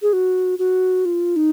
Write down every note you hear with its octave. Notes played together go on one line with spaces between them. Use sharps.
G#4
F#4
F#4
F4
D#4